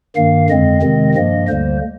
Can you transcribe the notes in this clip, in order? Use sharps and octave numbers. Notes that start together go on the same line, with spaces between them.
G2 D#3 A#3 F5
F2 D3 G#3 C4 D#5
C3 D#3 G#3 C4
G2 F3 A#3 D#5
D2 D3 G3 A#3 C5